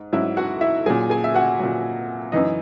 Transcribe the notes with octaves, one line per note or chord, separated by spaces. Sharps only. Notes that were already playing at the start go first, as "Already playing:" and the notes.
Already playing: G#2
G#2 F#3 E4 E5
F#4 F#5
E4 E5
A#2 F#3 G#4 G#5
G#4 G#5
E5
F#4 F#5
A#2 F#3
F#2 E3 D#4 D#5